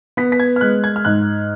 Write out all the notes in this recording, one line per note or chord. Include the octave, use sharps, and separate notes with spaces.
B3 B6
B6
G#6
F6
G#3 F#6
G#6
F6
G#2 F#6